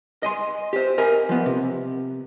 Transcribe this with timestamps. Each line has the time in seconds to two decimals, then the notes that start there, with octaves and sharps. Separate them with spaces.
0.23 D#5 G#5 C6
0.73 G4 C5
0.98 A#4 D#5 G#5
1.29 F3 B3
1.46 C3